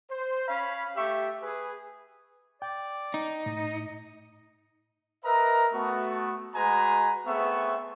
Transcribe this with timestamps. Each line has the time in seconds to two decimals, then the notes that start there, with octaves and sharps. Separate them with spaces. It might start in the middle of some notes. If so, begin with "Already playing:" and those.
0.11 C5
0.48 C#4 F5 B5
0.97 A3 G4 E5 C#6
1.42 G#4 B4
2.62 D5 G5
3.14 D#4
3.46 A2 D#5
5.25 A#4 B4 D#5 E5 A#5
5.74 A3 B3 F#4
6.55 G#3 F#4 B4 G#5 A#5
7.27 A3 B3 C4 G#4 E5 C#6